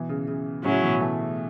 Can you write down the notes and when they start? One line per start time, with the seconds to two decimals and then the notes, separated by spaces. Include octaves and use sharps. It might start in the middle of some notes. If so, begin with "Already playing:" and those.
Already playing: B2 E3
0.09 C#3
0.28 C#3
0.64 A2 C#3 F#3 C#4 E4
0.83 B2 E3
1.00 E3 A3